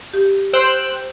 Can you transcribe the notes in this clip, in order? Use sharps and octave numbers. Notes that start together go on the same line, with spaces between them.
G4
C5 G5 E6 F#6